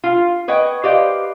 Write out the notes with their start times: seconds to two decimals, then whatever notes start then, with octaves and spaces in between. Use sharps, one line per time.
0.04 F4
0.48 B4 C#5 D#5 F#5 G5
0.84 G4 B4 C5 D5 D#5 F5